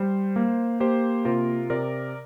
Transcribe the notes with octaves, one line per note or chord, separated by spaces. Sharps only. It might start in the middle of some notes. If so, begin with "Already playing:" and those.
Already playing: G3 C5
A#3
A#3 G4 C5
C3 F4 A#4
C3 A#4 D5